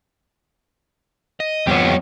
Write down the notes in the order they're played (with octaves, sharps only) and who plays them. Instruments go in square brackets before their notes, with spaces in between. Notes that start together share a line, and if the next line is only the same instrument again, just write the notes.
[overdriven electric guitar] D#5
[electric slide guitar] F2 G3 B3 [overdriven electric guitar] G4 C#5